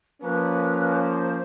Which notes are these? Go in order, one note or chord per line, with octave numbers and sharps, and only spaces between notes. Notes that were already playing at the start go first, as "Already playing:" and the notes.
F3 A#3 C#4 B4
C5